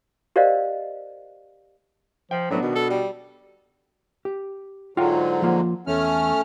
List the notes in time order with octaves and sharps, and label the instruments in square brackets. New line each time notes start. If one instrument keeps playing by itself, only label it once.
[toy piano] G4 A#4 C5 D5 D#5 F5
[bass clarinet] F3 [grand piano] G5
[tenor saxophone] A2 [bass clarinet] F#3 [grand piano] B3 D4
[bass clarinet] B2 [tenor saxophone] D#3
[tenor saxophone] A4
G3
[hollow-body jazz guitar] G4
[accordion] G#2 D3 F#3 [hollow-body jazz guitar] F4 F#5 G5
[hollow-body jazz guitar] F3 A#3 F4
[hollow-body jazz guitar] E2 [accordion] A3 C#4 F6